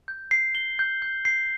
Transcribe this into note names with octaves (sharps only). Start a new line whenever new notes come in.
G6
C7
G7
G6
G6
C7